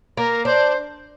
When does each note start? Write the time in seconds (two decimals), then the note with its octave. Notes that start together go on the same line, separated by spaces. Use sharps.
0.17 A#3 A#4
0.45 D4 C5